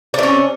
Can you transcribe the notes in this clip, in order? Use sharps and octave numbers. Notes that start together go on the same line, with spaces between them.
C3 C#4 D4